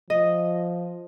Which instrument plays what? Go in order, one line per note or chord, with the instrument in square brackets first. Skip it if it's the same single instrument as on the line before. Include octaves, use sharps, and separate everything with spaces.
[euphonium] F3 [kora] D#5